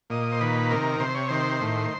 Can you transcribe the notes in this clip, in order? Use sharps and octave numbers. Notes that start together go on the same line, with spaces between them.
A#2 D#5
C5
D#3 B4
C3 A#4
C3 C5
C#5
D#3 C5
A2